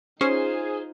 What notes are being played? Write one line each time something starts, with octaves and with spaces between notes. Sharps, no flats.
C#4 D#4 F4 G#4 C5